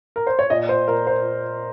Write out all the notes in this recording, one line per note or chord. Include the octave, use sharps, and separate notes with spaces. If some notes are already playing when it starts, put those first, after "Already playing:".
A#4
C5
C#5
A#2 D#5
C5
A#2 A#4
C5